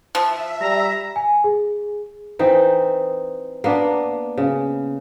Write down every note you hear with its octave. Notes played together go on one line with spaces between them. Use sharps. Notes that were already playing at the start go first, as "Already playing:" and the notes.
F3 E5
G3 A#5
G#5
G#4
E3 C4 D#4
A#3 B3 D4
C#3